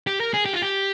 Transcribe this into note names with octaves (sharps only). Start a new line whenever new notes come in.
G4
A#4
G#4
G4
F4
G4